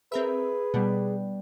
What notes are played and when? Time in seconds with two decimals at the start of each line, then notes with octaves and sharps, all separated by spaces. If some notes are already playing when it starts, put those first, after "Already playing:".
0.12 C4 G#4 A#4 B4 E5
0.74 B2 G3 B3 D4